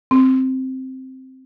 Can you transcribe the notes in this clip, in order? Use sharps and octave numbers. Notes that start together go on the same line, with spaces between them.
C4